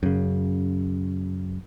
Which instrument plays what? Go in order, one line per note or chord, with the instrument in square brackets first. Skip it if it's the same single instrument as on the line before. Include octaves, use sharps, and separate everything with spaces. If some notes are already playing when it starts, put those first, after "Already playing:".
[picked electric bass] F#2 C#3